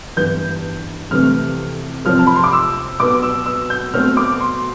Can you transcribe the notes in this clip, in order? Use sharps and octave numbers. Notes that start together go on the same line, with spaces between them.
G2 E3 B3 G6
F2 C3 E3 A3 F6
C3 F3 C4 F6
A5
B5
C6
D6
E6
B2 B3 D6
E6
E6
G6
B2 A3 C4 F6
D6
C6